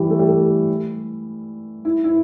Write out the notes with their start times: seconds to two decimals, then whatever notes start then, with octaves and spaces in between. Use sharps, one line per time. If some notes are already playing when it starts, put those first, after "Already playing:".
Already playing: E3 G3
0.10 A3
0.19 G3
0.27 A3
1.85 E4
2.04 E4